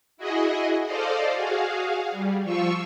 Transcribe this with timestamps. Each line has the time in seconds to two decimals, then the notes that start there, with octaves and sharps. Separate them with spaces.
0.17 E4 F#4 G#4 D#5
0.86 A4 C5 D5 D#5 F5
1.35 F#4 G#4 F5
2.12 G3
2.44 F3 F4 C#6 E6